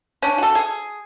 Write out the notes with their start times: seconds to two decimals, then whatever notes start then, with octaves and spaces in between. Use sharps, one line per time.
0.22 C#4 D4
0.38 F#4 A4
0.55 G#4